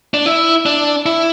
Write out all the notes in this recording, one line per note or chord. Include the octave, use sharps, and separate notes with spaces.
D4
E4
D4
E4